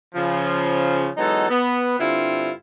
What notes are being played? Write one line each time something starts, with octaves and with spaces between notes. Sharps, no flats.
C#3 F3
E3 F#3 G#3 B3 D#4 A4
B3
G2 D3 C4 E4 F4